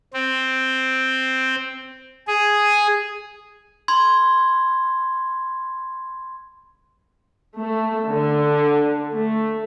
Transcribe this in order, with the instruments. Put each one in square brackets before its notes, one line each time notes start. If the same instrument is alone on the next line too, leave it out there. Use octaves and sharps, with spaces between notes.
[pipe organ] C4
G#4
[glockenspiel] B5 C6 G#6
[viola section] A3
D3
A3